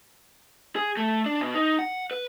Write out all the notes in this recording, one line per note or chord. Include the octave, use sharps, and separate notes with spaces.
G#4
A3
D4
B2
D#4
F#5
B4